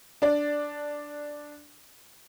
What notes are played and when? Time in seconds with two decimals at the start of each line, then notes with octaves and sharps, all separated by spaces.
0.22 D4 D5